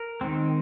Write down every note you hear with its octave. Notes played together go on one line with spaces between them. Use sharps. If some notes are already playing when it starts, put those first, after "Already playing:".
Already playing: A#4
D#3 G#3 C4